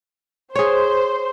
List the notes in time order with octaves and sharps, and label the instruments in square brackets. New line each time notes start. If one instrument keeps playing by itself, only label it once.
[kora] G#4 C#5 [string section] C5